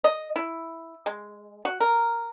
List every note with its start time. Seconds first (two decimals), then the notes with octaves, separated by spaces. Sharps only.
0.04 D#5
0.36 E4
1.06 G#3
1.65 F#4
1.80 A#4